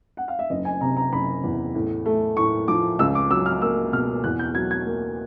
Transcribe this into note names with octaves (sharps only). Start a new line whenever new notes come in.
F#5
F5
E5
F#1 D#5
G#5
C3 A#5
A#5
F#1 B5
E2
A2
A3
A2 C#6
F3 D6
C#2 E6
D6
F#3 E6
F6
A#3 E6
B2 F6
E2 F#6
G6
F#3 G#6
G#6
A#3